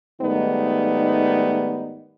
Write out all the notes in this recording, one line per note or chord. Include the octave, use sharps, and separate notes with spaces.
G#2 D#3 G3 A3 B3 D#4